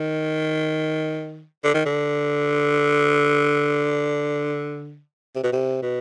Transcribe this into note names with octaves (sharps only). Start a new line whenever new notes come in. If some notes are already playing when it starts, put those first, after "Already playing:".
Already playing: D#3
D3
D#3
D3
C3
B2
C3
B2